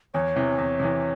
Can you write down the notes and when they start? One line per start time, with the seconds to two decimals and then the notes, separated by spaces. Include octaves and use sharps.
0.14 E2 C#5
0.36 C3 E3
0.58 E2
0.80 C3 E3